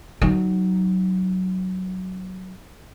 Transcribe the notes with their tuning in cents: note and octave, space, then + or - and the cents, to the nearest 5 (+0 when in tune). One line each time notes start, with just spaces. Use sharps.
F#3 +10 D#4 -5